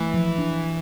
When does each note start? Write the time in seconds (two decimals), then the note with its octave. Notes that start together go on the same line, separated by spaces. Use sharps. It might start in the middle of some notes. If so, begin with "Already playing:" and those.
Already playing: E3 A3
0.14 F3
0.38 D4